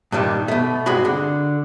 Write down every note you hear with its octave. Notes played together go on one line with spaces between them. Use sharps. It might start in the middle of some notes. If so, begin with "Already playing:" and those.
G2 A#2 D#3 G3
B2 A3
G2 G#3 C4 F#4 B5
D3